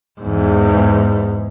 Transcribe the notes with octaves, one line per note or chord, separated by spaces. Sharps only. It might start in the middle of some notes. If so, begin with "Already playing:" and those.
E2 G#2